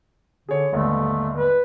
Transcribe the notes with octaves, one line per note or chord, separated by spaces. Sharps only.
D3 G#4 C#5
G1 D#2 G#2 A3
B4